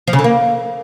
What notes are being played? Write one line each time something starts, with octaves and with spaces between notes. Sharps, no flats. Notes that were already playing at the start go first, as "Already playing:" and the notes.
F3
C#3
D3
A#3